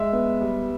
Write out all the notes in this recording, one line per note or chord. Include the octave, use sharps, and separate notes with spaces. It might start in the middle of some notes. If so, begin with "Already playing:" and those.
Already playing: G#3 E5
B3
G3